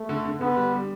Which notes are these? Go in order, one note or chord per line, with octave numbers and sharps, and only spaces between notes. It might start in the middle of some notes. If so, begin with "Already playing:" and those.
Already playing: A3
D3
D3
D3 B3
G3
G3